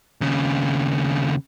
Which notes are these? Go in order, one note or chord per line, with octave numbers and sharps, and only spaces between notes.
D#2 C#3